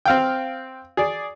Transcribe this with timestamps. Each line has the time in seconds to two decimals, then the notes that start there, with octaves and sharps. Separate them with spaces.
0.05 C4 F5 G5
0.97 G#4 D5